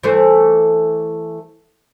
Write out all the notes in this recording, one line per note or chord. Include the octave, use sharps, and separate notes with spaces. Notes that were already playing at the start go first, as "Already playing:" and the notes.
E3 A3 C5